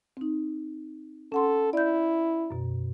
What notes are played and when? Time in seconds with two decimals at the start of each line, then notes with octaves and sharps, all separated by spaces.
0.17 C4 D#4
1.32 C#4 A4 F#5 C6
1.73 E4 D5 G6
2.50 F#2 B2